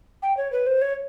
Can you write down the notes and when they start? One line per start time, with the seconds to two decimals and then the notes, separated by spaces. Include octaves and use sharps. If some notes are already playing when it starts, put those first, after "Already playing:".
0.22 G5
0.37 C#5
0.52 B4
0.67 C5
0.82 C#5